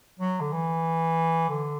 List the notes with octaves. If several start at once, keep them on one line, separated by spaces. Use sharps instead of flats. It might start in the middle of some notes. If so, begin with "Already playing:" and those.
F#3
D3
E3
D3